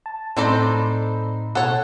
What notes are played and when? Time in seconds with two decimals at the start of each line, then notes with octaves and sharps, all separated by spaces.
0.06 A5
0.37 A2 C4 D4 D#4 A4 C5 D5 B5
1.55 B2 A4 C#5 F#5